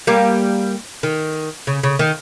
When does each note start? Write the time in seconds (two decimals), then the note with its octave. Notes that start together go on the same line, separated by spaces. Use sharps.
0.07 G3 A#3
1.03 D#3
1.67 C#3
1.83 C#3
1.99 D#3